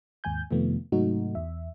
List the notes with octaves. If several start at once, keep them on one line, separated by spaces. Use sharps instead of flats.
D#2 G#2 G#5 G6
F2 C3 D#3 F3 A3 B3
G#2 C3 F#3 A3 D#4 F#4
E2 E5